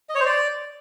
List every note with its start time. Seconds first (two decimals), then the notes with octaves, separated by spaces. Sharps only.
0.09 D#5
0.15 C#5
0.20 C5
0.26 D5